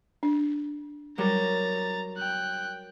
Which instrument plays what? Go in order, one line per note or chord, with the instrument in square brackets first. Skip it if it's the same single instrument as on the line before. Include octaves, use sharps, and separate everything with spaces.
[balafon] D4
[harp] F#3 G3 A#4 [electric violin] A#5 A6
[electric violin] G5 F#6